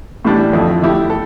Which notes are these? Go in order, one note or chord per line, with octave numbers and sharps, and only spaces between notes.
A2 E3 G3 D4 G4
F2 D3 F3 A3 E4
D3 A3 E4 G4
A4